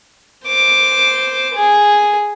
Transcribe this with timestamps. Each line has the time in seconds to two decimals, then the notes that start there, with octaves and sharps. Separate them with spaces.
0.46 C5 D6
1.55 G#4